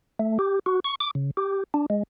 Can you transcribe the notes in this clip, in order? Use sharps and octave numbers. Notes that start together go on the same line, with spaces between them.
A3
G4
F#4
C#6
D6
C#3
G4
D4
G#3